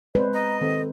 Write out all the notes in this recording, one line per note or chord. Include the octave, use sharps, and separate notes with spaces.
G#3 C4 B4 C5 D5
D#5 A#5
D#3 C4 A4